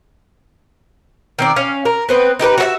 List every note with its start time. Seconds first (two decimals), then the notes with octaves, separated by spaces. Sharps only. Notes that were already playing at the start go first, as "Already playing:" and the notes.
1.39 D#3 C4 D5
1.56 C#4 F5
1.85 A#4
2.09 B3 C4 B4
2.39 D#4 G4 A4 B4
2.58 F#4 G4 E5